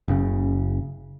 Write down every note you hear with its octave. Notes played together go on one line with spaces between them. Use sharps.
F#1 C#3